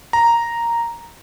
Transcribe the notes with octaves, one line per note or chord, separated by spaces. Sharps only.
A#5